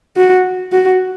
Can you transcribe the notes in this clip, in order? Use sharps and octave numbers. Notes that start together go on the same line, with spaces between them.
F#4
F#4